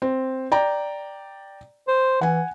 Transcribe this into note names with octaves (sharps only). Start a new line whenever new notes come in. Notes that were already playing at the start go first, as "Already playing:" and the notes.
C4
D5 G5 A#5
C5
E3 F#5 G#5